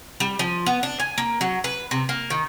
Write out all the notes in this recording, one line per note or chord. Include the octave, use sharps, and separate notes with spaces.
G3
F3
B3
D4
G#5
A#3
F#3
B4
C3
A#3
D#3